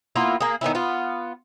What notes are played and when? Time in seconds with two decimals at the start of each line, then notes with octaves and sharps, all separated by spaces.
0.16 A#3 B3 E4 F4
0.40 A#3 G#4
0.61 D#3 B3 C#4 E4
0.75 B3 F4